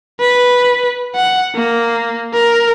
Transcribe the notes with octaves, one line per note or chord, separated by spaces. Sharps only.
B4
F#5
A#3
A#4